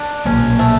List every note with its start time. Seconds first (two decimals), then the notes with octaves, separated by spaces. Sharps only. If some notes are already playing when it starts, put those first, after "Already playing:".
Already playing: D4
0.25 B1 A#2 G3 A#3 C#4
0.59 A3